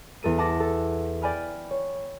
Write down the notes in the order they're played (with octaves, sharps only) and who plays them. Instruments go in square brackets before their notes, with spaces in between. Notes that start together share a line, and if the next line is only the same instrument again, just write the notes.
[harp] E2 A4 D#7
F#5 A5 D6 A#6
A4
D5 G5 G#5 B5 F6
C#5